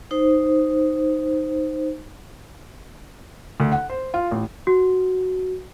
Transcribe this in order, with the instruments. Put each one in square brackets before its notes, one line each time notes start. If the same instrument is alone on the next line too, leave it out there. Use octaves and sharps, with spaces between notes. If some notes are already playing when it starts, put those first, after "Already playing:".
[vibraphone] D#4 C5
[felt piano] D2
F#5
C5
F4
A1
[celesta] F#4